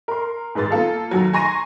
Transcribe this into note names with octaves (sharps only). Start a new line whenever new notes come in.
A#4 C6
D#2 G#2 B4 C6 A6
A#3 F4 A4 F5
D#2 F#3
G#5 A#5 C6 C#6 A#6 D#7